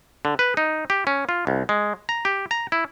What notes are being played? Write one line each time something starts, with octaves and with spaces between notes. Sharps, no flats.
D3
B4
D#4
G4
C#4
F4
C2
G#3
A#5
G4
A#5
E4